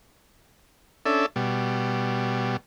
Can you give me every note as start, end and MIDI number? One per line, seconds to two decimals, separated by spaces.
1.06 1.26 61
1.06 1.26 62
1.06 1.26 69
1.06 1.26 76
1.36 2.57 47
1.36 2.57 55